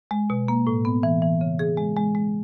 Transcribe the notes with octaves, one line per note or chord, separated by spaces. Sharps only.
G#3
B2
A#3
A2
B3
E3
E3
C#3
G#4
G#3
G#3
G#3